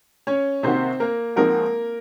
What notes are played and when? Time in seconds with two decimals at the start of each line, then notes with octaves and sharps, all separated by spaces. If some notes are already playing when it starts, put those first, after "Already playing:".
0.27 C#4 C#5
0.63 C3 D#3 A#3 C4 D#4 F#4 C5
1.00 A#3 A#4
1.36 F3 G#3 A#3 C4 D#4 F#4 A#4